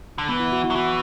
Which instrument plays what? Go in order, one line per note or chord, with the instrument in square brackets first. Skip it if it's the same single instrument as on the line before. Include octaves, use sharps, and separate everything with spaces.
[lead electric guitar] D3
[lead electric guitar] E3 [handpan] B3
[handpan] E4
F#4
E4
[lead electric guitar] F#3
[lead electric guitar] E3 [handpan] F#4